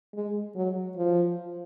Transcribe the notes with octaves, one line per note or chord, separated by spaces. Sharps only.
G#3
F#3
F3